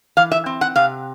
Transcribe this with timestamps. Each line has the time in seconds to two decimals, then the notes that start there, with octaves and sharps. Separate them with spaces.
0.17 E3 F5
0.32 E5
0.46 C4
0.61 F#5
0.76 C3 F5